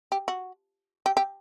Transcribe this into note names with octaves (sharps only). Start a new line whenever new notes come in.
G4
F#4
G4
G4